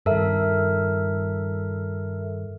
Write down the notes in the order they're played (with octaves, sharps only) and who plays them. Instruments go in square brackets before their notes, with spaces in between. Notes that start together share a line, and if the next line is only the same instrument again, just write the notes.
[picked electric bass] G2 D#3 [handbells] A4 A#4 E5